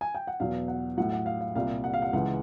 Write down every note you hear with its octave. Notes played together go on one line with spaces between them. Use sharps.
G#5
G5
F#5
E2 B2 F#3 F5
F#5
A2 F#3 F#5
F#5
F5
F5
C2 A#2 G3 F5
F#5
F5
F#5
C#2 C#3 E3 G#3 F#5